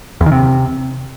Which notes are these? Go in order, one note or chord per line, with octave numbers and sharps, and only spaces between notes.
E2
D#3
C3